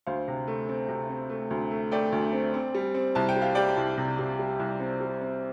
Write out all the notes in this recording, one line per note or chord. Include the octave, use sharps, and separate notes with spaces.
D2 C5 F5
C3
A3
C4
C3
C4
A3
D2
A3
A3 D5 G5
D2
C4
C4
G3
C4
C2 A5
G5
G3
F5
G3 D5 G5
C2
C3
C3
G3
C2
C4
G3
C4